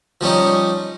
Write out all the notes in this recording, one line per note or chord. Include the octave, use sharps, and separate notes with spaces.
F3 G3 C#4 D#4